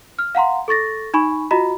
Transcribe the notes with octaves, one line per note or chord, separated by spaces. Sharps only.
F6
F5 F#5 A#5 C6
A4 C#6 A6 A#6
D#4 G#5 B5 C#6
F4 F#4 D#5 A#5 B5